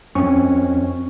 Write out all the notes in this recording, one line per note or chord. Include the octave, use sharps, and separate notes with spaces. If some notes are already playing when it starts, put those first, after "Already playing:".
F2 C4 C#4 C#6